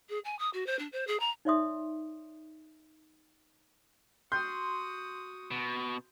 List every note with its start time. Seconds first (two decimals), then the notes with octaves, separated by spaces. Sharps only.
0.09 G#4
0.25 G#5
0.39 D#6
0.53 F#4
0.66 C5
0.79 D4
0.92 C5
1.07 G#4
1.20 A#5
1.45 D#4 C#5 D5 E5 C6 D#6
4.32 F#4 C6 D#6 G6
5.51 B2